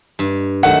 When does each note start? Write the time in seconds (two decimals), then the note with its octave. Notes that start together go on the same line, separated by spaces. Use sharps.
0.19 G2
0.63 D#3 F#3 A3 F#5